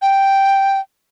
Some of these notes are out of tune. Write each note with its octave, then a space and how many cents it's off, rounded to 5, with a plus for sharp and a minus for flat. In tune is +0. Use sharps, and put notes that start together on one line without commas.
G5 +0